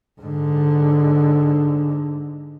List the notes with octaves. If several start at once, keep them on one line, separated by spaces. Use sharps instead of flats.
G#2 D3